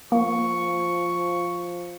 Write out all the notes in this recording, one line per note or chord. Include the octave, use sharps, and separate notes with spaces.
F3 A#3 C#6